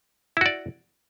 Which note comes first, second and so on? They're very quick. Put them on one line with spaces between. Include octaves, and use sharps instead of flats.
E4 F#4 D5